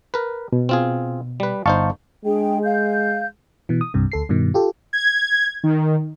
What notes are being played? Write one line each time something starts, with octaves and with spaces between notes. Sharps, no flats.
A#4 B4
B2
C4 F4 G#4
G3 B4
G1 D#4 C5 F5 A5 C#6
G#3 D4 G#4 G5
F5 G6
B2 E3
D#6
C2 G2 C3
D2 A4 C7
G2 B2 D#3
F4 G4 A4
G#6
D#3